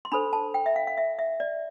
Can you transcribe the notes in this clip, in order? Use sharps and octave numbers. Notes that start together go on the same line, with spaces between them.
C6
D4 A4 C5 B5
A5
G5
E5
F5
F5
E5
E5
D5